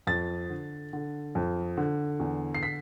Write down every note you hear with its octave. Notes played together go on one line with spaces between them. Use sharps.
F2 A6
D3
D3
F2
D3
E2
C7
B6